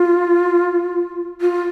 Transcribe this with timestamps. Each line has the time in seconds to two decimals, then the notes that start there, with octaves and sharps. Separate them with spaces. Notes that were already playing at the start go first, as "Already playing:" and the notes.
Already playing: F4
1.41 F4